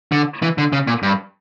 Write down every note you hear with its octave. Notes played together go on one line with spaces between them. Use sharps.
D3
E3
D3
C#3
A#2
G2